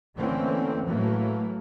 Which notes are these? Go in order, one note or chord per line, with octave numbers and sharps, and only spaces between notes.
D3 E3 A3 A#3 C4 C#4
A2 E3 F#3 A3 A#3